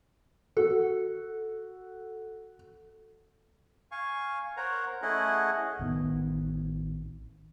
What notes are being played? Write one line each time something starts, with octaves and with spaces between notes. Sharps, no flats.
F#4 A4
F5 G#5 C#6
A#4 C5 C#5 F#5 A#5
A3 C#4 E4 G#4 D#5 F#5
A1 D#3 B3